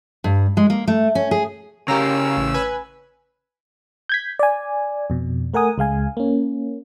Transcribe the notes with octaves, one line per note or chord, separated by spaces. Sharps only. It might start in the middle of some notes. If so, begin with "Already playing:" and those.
G2
G#3
A#3
A3
C#4
G#4
C#3 C#4 G4 A#4 F5 A#5 E6
A1
B4 G#5
G6 G#6 B6
D5 G#5
F2 B2
A3 A#4 F#5 G#5 D#6
C#2 G#3 F5 G#5
A#3 C#4